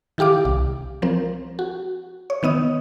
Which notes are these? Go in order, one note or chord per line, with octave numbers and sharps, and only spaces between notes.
D#3 E4 G4 F5 D6
C2
F3 C4 A#4
F#4
C#5
D#3 B3 D#5 D#6